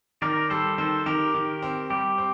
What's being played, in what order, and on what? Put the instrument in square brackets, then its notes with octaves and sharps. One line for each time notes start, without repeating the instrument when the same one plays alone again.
[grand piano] D#3 [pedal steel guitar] A#4 D5
[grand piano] G3 [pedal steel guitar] A4 C5
[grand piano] D#3 [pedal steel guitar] A4 C5
[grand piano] D#3 [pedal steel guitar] G4 A#4
[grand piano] D#3
C4
[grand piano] G3 [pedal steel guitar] G4
[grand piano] C4